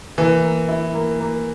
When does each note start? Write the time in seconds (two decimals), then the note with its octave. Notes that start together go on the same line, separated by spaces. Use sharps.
0.18 E3 A#3
0.43 A#3
0.68 E4
0.94 A#3
1.19 A#3